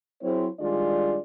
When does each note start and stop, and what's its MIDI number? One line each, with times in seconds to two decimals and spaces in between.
0.22 0.47 54
0.22 0.47 60
0.22 0.47 64
0.22 0.47 68
0.22 0.47 72
0.22 0.47 73
0.60 1.18 51
0.60 1.18 55
0.60 1.18 56
0.60 1.18 62
0.60 1.18 65
0.60 1.18 74